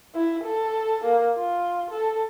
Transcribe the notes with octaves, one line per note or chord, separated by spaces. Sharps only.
E4
A4
A#3
F4
A4